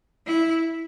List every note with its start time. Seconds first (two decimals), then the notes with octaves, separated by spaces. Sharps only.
0.27 E4